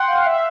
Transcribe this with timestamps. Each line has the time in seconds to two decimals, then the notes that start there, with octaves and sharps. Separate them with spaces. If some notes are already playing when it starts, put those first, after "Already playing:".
Already playing: F#5 G5 C6
0.08 F5
0.26 E5